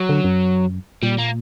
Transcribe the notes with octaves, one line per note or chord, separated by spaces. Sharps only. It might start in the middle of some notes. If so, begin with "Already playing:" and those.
Already playing: F#3
D3
F#2
A#2 G3
A#3